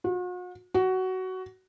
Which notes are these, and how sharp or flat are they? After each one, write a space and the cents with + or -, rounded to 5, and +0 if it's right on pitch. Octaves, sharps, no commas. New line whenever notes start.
F#4 -45
F#4 +15